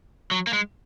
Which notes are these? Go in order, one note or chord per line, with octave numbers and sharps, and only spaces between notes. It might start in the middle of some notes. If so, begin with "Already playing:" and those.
F#3
A#3
G#3